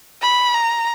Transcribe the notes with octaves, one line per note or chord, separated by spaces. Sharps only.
B5
A#5